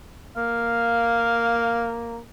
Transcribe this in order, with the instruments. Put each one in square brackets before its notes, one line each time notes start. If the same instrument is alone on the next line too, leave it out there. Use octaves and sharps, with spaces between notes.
[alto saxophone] A#3 [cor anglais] F5